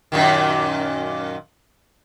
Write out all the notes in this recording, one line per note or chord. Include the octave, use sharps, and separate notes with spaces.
F#2 A#2 D#3